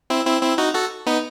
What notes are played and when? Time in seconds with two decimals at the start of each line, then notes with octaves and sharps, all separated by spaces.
0.10 C4 E4
0.26 C4 E4
0.42 C4 E4
0.58 D#4 F#4
0.74 F#4 A4
1.06 B3 D#4